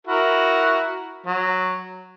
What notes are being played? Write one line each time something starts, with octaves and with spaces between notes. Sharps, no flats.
E4 F#4 A#4
F#3